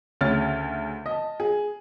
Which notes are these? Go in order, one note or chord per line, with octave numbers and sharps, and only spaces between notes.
D2 C#3 C#5 F6 A6
D#5 A5
G#4